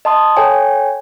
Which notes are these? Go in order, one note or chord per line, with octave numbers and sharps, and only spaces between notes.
D#5 A5 C6 D#6
A4 C#5 G5 G#5